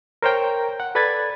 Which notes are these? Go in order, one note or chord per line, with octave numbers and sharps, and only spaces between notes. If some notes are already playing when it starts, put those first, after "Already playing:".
A#4 C5 C#5 G5 A#5
F#5
A4 B4 D5 B5 G#6 A6